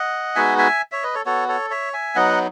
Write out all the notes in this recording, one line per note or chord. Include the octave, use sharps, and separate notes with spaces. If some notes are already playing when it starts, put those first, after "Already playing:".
Already playing: D#5 F#5
G#3 B3 D#4 F#4 E5 G#5
E5 G#5
C#5 E5
B4 D#5
A4 C#5
B3 F#4 A4 C#5
A4 C#5
C#5 E5
E5 G#5
F#3 B3 D#4 D#5 F#5